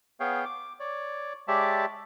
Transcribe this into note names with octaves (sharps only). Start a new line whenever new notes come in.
B3 G#4 C#5 F5 G5
D6
C#5 D5
G#3 G4 C#5 D5 E5 A5